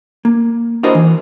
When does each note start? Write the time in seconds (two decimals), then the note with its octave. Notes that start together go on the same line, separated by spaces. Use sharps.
0.25 A#3
0.83 D4 E4 F#4 A#4 C5 D#5
0.95 E3